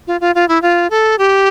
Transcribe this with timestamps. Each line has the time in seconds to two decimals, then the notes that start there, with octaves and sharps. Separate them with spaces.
0.07 F4
0.21 F4
0.35 F4
0.48 E4
0.62 F4
0.90 A4
1.19 G4